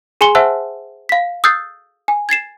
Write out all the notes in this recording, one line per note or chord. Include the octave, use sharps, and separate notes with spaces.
G#4 G#5 C6 C#7 G7
C5 E5 F#5 A5 E6 F#6
F5 B6
D#6 E6 F#6 G6 A6 C7
G#5
G#6 A6 C7 E7